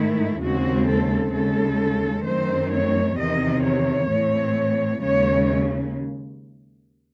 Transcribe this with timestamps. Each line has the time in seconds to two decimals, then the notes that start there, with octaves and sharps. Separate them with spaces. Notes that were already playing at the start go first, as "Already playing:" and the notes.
Already playing: G#2 D#3 A3 E4
0.42 D#2 C#3 G#3 C4 F#4
0.88 A4
1.34 D#2 C#3 G#3 A4
2.26 F#2 D#3 A3 C4 C5
2.72 C#5
3.18 E2 C3 D#3 D#5
3.64 C#5
4.11 A2 E3 C4
5.02 D#2 C#3 G#3 C#4 C#5